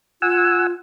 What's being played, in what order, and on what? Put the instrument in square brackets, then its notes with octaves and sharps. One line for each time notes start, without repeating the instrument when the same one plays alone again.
[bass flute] F4 [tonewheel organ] F#5 G#5 E6